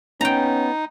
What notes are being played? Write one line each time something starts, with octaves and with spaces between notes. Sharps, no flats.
B3 C#4 D#4 G5 A#5